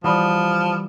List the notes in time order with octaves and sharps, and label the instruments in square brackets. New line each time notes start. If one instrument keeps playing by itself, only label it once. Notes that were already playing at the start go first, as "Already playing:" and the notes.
[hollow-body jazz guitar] E3 G3 F#4 [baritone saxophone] F3 [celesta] D5 B5 D#6